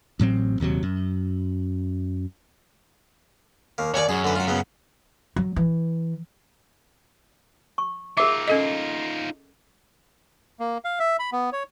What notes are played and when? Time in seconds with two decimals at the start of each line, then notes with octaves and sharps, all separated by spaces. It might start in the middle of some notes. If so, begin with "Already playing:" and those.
0.20 A1 A2 F#3 C4
0.60 D#1 D#2 C3 F#3
0.83 F#2
3.78 D#2 A#3
3.94 D#2 C#5 D5 G#5 C#6
4.09 F#2 G#4
4.24 D3 B4
4.36 F4 F#5
4.47 C#3 F#3 B3
5.36 F#3
5.56 E3
7.78 C#6
8.17 D#4 F4 G#4 A#4 E5 D6
8.48 C#4 A4 D#5
10.60 A#3
10.85 F5
10.99 E5
11.19 B5
11.32 B3
11.53 C#5